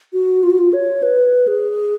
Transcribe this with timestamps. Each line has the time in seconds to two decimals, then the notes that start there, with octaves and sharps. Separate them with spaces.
0.13 F#4
0.43 F4
0.50 F#4
0.58 F4
0.73 C#5
1.03 B4
1.48 G#4